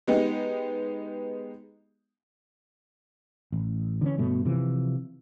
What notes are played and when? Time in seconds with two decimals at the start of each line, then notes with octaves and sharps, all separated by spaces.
0.07 G#3 B3 D#4 G4
3.52 A1
4.01 D3 E3 C4 C#4
4.18 G2 B2 A3
4.45 C3 E3 F3